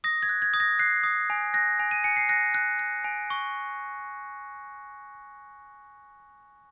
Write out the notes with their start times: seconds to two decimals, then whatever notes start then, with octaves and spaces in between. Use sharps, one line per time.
0.04 D#6 A#6
0.23 G#6
0.29 F#6
0.42 G#6
0.54 D#6
0.60 A#6
0.79 F#6 C7
1.04 D#6
1.30 G#5
1.54 F#6 A#6
1.79 G#5
1.91 D#7
2.04 G#5 C#7
2.17 C7
2.29 F#6 A#6
2.54 F#6
2.79 F#6
3.04 G#5
3.30 C#6